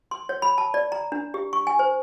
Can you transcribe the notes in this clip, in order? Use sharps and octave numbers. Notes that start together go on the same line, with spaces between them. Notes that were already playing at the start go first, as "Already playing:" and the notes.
C6
C#5
B5
A5
D5
A#5
D4
G4
C#6
G#5
C5